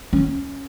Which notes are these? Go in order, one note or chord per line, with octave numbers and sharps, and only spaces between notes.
C#4